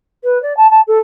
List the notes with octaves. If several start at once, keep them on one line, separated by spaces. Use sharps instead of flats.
B4
D5
A5
A5
A4